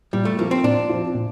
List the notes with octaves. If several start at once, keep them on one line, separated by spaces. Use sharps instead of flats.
A#2 G3
A3
F3 A#3 C4 F4
C4
A#2 D4
F3 C4 F4
A#2